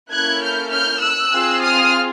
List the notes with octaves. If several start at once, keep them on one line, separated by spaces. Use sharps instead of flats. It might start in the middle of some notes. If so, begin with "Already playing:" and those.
A#3 C#4 E4 A4 F#6 G#6
F6 G6
F6 G6
E6 F#6
C4 F4 G#4
D#6 F6